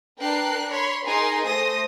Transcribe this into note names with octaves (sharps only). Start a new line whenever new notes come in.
D4 A#4 B4 G5 F#6 C7
C#5 B5 C6
D#4 G#4 A#4 G#5 C6
A3 C5 D#6 A#6